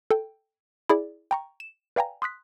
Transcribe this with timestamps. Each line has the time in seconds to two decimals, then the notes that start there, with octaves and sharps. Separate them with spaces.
0.11 A4 G5
0.89 E4 G#4 D5
1.31 G5 A#5 C#6
1.60 E7
1.96 B4 D5 F5 G5 G#5 A#5
2.22 C6 D#6 F#6 B6